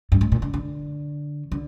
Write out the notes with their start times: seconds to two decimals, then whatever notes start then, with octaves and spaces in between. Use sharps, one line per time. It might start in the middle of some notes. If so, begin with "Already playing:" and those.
0.12 G2
0.21 G#2
0.32 A#2
0.42 D3
0.54 D3
1.52 D3